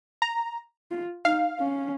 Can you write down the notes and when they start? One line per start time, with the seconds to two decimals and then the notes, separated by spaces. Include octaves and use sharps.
0.22 A#5
0.91 F4
1.25 D#4 F5
1.59 C#4